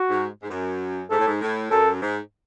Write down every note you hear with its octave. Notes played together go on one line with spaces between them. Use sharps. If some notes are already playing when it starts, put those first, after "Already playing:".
Already playing: F#4
G#2
G#2
F#2
G#2 A4
A2
G#2
A2
F#2 A4
G#2